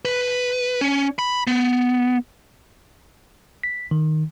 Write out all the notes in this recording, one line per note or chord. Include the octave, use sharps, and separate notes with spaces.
B4
C#4
B5
B3
B6
D#3